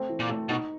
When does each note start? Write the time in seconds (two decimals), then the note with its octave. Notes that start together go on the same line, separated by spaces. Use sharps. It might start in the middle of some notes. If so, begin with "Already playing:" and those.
Already playing: A3 C4
0.09 E3
0.20 A#2
0.29 A3
0.49 B2 D#4